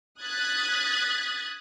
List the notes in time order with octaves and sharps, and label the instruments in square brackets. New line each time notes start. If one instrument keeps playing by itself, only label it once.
[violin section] D#6 F#6 G#6 A6 B6